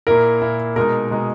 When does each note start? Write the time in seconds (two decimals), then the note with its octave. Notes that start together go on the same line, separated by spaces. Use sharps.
0.07 A#2 A#3 E4 A#4
0.42 A#2 A#3 E4
0.76 B2 G#3 D#4 A#4
1.11 B2 G#3 D#4